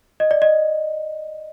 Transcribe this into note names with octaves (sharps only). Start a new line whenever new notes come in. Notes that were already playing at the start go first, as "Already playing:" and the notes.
D#5
D5
D#5